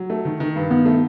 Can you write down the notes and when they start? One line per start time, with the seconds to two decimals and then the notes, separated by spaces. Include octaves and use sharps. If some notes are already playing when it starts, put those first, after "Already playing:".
Already playing: F#3
0.10 A3
0.25 D#3
0.40 D#3
0.56 G2
0.70 D#3 B3
0.86 A3